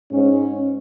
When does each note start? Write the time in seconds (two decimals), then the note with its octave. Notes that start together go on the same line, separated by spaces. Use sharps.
0.12 G#2 C#4